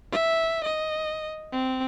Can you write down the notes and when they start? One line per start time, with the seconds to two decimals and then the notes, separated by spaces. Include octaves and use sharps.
0.12 E5
0.64 D#5
1.52 C4